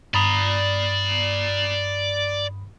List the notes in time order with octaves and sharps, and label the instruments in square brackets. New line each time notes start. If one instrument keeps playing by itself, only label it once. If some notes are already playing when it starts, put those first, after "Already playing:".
[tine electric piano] G2 B5 D#6 [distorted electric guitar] D5 A#5